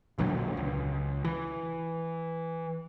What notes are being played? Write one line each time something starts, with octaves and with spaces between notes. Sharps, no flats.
E1 A#1 D3 F#3
C#2
E3